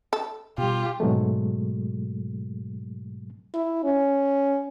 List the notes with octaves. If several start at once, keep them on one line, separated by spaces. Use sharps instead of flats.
A4
B2 G3 F4 G4
G#2 B2 F#3 G#3 A3
E4
C#4